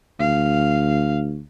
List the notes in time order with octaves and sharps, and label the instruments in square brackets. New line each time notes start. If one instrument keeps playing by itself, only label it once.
[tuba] D2 [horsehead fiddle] F5